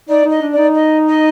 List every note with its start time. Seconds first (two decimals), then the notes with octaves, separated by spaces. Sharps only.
0.08 D#4 D5
0.25 D#4
0.30 D#5
0.42 D4
0.52 D5
0.58 D#4
0.75 D#5
1.07 D#5